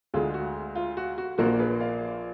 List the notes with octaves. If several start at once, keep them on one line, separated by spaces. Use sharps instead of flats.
D2 D3 G#3 F4 G#4
F#4
F4
F#4
F#4
A#1 A#2 F3 A#3 D4 F#4 A#4
G#4 B4
D5 F5